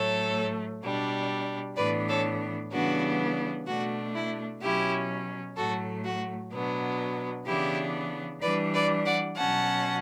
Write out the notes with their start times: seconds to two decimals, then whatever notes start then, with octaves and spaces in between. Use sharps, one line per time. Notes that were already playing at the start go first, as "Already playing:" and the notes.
Already playing: A2 F#3 A3 A4 C#5
0.83 B2 G3 D4
1.77 A2 E3 B3 D4 B4 D5
2.09 A4 C#5
2.72 C#3 E3 G3 B3 D4 F#4
3.67 B2 A3 D4 F#4
4.15 E4
4.62 B2 F#3 C#4 E4 G4
5.57 A2 F#3 A3 F#4 A4
6.05 F#4
6.52 B2 F#3 B3 D4
7.47 C#3 E3 B3 D4 E4 G4
8.42 E3 G3 D4 B4 D5
8.74 B4 D5
9.05 D5 F#5
9.37 B2 F#3 C#4 F#5 A5